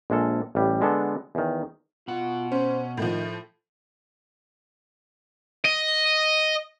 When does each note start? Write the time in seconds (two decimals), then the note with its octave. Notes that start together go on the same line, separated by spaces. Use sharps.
0.10 A#1 G#3 A#3 A4
0.55 A1 G3
0.81 D3 G#3 B3 D4 A4
1.35 E2 D#3
2.08 B2 F4 F#5
2.52 C#4 C5
2.97 A2 D#3 F3
5.65 D#5